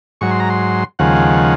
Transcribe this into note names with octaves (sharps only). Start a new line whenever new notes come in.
G#2 F#3 C#6
C6
A#5
C6
D#2 C#3 F3 G#3 F#5